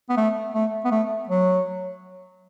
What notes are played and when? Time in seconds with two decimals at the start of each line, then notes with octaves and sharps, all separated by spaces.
0.09 B3
0.17 A3
0.54 A3
0.85 B3
0.91 A3
1.29 F#3